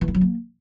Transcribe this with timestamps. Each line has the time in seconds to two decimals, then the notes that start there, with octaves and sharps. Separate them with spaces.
0.01 E3
0.08 E4
0.15 F#3
0.21 A#3